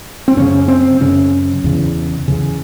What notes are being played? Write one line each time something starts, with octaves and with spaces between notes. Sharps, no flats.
C4
F#2 C#3 C#4
C4
F#2 C#3 C#4
E2 C#3
E2 C#3